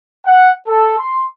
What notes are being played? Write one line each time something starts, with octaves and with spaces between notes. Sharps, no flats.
F#5
A4
C6